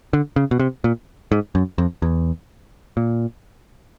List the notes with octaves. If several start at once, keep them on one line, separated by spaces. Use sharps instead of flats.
D3
C#3
B2
C3
A#2
G#2
F#2
F2
E2
A#2